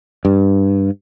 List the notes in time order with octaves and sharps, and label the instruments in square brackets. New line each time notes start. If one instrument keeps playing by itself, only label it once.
[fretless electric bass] G2